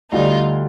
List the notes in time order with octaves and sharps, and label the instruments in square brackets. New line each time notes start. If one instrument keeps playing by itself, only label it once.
[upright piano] D2 D3 G3 [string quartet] D#4 F4